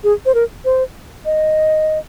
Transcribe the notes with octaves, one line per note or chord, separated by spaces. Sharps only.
G#4
C5
A#4
C5
D#5